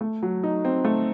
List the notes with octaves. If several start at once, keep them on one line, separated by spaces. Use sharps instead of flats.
A3
F#3
D#4
C4
A3